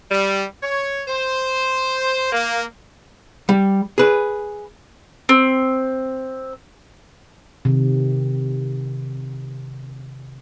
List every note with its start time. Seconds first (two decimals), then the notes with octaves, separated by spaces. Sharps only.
0.11 G3
0.63 C#5
1.08 C5
2.33 A#3
3.49 G3
3.98 G#4 B4
5.29 C4
7.65 C3 D#3